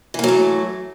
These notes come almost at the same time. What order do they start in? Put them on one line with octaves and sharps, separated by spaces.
E3 A#3 F#3 A3